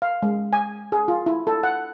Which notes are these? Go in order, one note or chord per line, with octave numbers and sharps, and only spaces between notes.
F5
G#3
G#5
G#4
F4
E4
A4
F#5